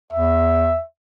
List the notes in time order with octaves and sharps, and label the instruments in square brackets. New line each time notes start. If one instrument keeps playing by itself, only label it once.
[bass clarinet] E2 [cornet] E5